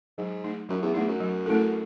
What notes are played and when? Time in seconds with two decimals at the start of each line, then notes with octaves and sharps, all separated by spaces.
0.18 G#2 F#3
0.44 A3 D#4
0.69 F#2 F#3
0.83 E2
0.94 E2 A3 D#4
1.08 F#2
1.20 F#3
1.46 A3 C#4 E4 A4